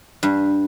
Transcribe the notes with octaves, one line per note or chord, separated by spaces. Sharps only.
G2